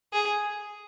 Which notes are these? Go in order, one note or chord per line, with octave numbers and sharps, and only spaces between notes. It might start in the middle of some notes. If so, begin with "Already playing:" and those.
G#4